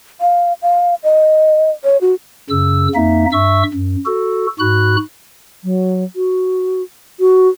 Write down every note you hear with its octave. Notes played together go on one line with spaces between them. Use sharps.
F5
F5
D#5
C#5
F#4
F#2 C#3 E6
F2 A#3 D#4 E5
G2 E5 C#6 E6
F#2
F#4 A4
G#2 F#4 B5 F#6
F#3
F#4
F#4